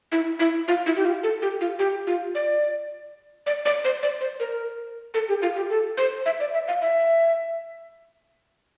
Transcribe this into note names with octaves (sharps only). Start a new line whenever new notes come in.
E4
E4
F4
E4
G4
F4
A4
G4
F4
G4
F4
D5
D5
D5
C5
D5
C5
A#4
A4
G4
F4
G4
A4
C5
E5
D5
E5
F5
E5